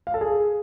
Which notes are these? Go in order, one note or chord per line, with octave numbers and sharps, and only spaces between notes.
F5
A4
G#4